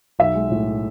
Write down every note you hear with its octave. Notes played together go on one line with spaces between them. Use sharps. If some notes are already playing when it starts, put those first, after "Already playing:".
B1 E5
G#3
A2